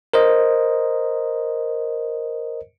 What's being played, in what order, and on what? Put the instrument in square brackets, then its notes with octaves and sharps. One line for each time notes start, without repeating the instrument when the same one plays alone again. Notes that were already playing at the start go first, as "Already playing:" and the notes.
[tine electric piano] A#4 C5 D#5